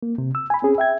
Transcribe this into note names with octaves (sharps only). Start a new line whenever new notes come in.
A#3
C3
E6
G#5 B5
C4 C#4 G#4
E5 G5 G#6